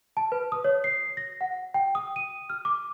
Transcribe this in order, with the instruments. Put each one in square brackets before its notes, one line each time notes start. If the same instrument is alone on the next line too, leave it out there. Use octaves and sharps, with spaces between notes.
[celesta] A5
B4
D#6
C#5
C7
A#6
F#5
G5
D#6
D#7
F6
D6